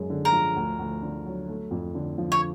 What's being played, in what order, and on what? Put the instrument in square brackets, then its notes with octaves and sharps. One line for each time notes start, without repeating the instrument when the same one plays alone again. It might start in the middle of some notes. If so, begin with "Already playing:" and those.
Already playing: [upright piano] F#2 G#3
D3
[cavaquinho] A#4
[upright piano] F3
D2
D2
D3
F#3
A3
F2
D3
F3
[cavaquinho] C#5